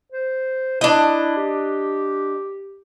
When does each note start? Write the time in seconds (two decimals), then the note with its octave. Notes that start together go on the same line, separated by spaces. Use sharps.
0.12 C5
0.81 D4 E4 D#5
1.37 G4